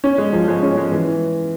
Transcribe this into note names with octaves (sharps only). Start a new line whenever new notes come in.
C#4
G#3
F3
G#3
C#4
G#3
E3